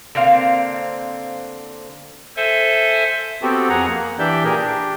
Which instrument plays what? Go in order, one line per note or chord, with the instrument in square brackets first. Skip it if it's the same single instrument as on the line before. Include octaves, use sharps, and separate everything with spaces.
[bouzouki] D3 A#3 C4 F5
[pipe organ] A4 C5 E5 G#5
[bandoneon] B3 C4 F#4 G4 A4
F2 G#4 F#5 A#5
A#3
E3 D4 G4 D5 E5 G6
A#2 G4 G#4 A#4
D4 G4